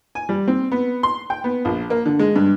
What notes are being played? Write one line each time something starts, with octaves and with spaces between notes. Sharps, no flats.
G#5
G3
C4
B3
C6
G5
B3
A#1
A#3
D3
G#3
G2